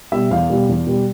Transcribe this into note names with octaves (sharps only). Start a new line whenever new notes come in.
B2 G3 E5
E2 F5
B2 G3
E2
B2 G3